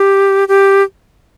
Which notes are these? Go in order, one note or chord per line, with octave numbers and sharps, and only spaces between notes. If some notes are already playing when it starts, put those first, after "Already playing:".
Already playing: G4
G4